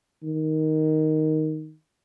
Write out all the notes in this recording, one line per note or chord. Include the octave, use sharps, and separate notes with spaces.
D#3